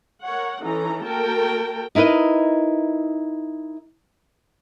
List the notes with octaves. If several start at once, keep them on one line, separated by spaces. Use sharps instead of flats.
A#4 C#5 F#5
E3 C#4 D#4 A4 A#5
A#3 F#4 A4 A#4 G5 A5
D#4 E4 A#4 B4 D#5